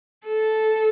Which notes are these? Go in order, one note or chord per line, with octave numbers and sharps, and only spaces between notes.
A4